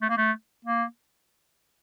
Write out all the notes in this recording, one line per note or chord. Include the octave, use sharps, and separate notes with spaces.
A3
A#3
A3
A#3